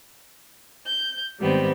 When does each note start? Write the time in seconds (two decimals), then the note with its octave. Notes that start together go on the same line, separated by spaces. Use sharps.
0.86 G6
1.38 G#2 D#3 G3 B3 C4